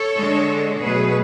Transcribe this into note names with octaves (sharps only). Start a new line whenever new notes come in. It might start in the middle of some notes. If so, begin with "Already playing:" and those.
Already playing: A4 C#5
D3 G#3 D4
B2 F#3 A3 G#4 B4